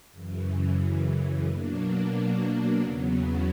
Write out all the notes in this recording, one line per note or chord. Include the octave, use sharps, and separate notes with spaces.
F#2 C#3 E3
B2 F#3 A#3 D4
E2 C#3 F#3 B3